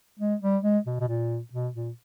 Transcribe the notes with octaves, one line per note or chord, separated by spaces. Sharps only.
G#3
G3
G#3
B2
B2
A#2
B2
A#2